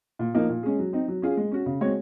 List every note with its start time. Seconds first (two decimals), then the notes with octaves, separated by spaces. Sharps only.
0.19 A#2
0.34 F3 A#3 D#4
0.49 A#2
0.63 G#3 C#4 G#4
0.79 F#3
0.93 C4 D#4
1.08 F#3
1.22 C#4 F4 G#4
1.37 G#3
1.52 C#4 F#4
1.66 C#3
1.81 G#3 C4 F#4 C#5